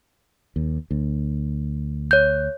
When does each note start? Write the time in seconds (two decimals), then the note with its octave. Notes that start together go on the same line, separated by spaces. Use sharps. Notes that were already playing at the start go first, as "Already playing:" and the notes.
0.56 D#2
0.91 D2
2.11 C#5 G6